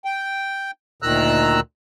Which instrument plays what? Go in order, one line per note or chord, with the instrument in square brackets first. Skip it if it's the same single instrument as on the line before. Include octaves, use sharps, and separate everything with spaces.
[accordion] G5
D2 A#2 D#3 A#5 E6 F#6